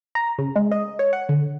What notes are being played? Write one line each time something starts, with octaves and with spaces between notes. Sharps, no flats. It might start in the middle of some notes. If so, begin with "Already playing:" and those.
A#5
C#3
G#3
D#5
C#5
F#5
D3